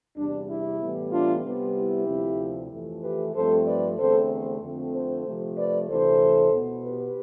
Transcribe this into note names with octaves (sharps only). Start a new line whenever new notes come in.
E2 C3 G3 D4
E4
A2 E3 G3 B3
D4 F4
C3 G3 B3
E4 G4
D2 C3 F3 C4
F2 E3 A3
G4 B4
G2 F3 A3 C4 A4 C5
B4 D5
E2 D3 A3 C4 A4 C5
F2 D3 A3 C4
A4 C5
C3 F3 A3
B4 D5
D2 C3 E3 A4 C5
B2 B3
G4 B4